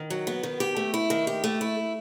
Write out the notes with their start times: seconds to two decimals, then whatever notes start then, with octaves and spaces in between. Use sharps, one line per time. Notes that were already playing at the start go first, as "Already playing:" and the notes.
Already playing: D#3
0.10 F#3
0.27 B3
0.43 D#3
0.60 G4
0.77 A3
0.94 E4
1.10 D#3
1.27 G4
1.44 A3
1.61 E4